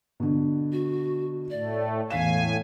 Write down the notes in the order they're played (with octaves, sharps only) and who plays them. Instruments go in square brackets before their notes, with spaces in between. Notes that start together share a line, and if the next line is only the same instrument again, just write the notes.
[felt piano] B2 D3
[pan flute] F#4
[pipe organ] A2 A3 [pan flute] D5
[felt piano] E1 B6 E7 [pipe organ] A2 G#5 [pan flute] F5